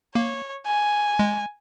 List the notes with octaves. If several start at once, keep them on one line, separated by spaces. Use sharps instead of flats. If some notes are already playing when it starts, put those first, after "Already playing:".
A#3 C#5
G#5
G#3